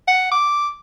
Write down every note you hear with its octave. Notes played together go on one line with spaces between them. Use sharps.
F#5
D6